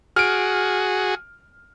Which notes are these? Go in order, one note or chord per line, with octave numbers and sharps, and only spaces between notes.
F#4 G#4 F6 D7